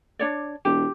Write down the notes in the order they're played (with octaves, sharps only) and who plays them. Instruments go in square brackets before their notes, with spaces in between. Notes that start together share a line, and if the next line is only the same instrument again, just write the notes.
[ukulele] D4 C#5 D5
[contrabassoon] E1 [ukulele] G4